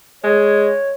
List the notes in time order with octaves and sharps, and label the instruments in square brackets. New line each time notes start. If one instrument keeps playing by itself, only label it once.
[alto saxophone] G#3 [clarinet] C#5